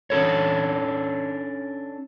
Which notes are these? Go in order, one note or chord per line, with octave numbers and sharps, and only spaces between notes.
C#4 D4 A4 C#5